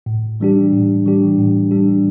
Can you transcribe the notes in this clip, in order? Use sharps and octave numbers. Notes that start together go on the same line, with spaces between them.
A2
E3 G3 D4 G4
A2
E3 G3 D4 G4
A2
E3 G3 D4 G4